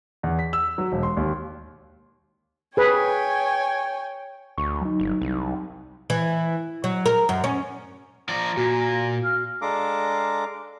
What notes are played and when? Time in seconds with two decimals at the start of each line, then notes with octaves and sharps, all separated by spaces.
0.23 E2
0.39 B6
0.53 E6
0.78 F#3
0.92 E1
1.03 C6
1.17 D#2
2.77 G#4 B4 C#5 G5 G#5
4.58 D2 C#6
4.81 F#3 D#4
5.00 G1
5.22 C2
6.10 E3
6.84 F#3
7.06 A#4
7.29 F#2
7.44 C#4
8.29 F3 D5 A#5
8.57 A#2 F#4
9.24 F5
9.62 G#3 D4 A4 F5 A#5 D6